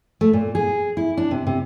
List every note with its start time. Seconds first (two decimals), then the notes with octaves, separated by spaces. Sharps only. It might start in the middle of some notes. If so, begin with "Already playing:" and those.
0.21 A3
0.33 A#2
0.55 G#4
0.97 E4
1.17 D4
1.31 C3
1.47 C3